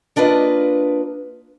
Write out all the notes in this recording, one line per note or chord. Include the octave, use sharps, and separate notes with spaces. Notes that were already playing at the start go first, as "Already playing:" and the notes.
A#3 D4 F4 B4 D#5